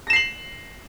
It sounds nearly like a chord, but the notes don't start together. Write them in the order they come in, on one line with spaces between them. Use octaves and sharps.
A#6 E7 C7 F#7